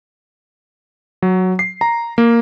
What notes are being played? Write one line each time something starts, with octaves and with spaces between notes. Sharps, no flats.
F#3
C7
A#5
A#3